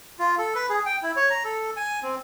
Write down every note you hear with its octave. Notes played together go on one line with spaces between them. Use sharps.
F4
A4
B4
G#4
G5
E4
C#5
A#5
A4
G#5
C4